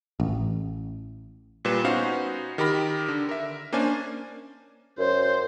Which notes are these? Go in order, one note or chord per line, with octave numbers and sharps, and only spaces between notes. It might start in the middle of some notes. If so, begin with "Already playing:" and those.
A1
A#2 G3 B4 E7
B3 C#4 D#4 F#4 C5 F5
D#3 G4 A#4 B5 A#6
D3
A#4 E5
A#3 C#4 D4 C5 D5 G#5
F#2 C5